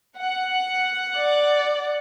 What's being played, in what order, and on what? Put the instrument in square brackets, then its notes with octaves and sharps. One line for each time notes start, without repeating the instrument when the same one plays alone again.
[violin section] F#5
[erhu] D5